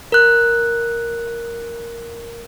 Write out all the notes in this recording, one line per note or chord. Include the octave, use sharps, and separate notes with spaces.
A#4 F#6